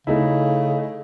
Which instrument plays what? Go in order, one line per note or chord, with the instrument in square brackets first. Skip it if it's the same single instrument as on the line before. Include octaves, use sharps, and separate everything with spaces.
[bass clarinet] C#3 [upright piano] A3 D#4 E4